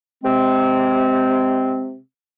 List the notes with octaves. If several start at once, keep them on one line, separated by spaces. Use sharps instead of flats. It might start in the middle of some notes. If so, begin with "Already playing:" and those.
C3 G#3 C4